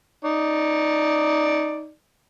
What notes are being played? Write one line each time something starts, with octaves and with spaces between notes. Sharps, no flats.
D#4 D5